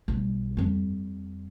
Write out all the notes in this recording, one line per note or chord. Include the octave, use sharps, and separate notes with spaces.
B1 G3
F2 G3